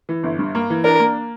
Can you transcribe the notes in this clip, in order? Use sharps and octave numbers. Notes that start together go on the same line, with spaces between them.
E3
G1
G2
A#3
E3
D4 A#4
A#3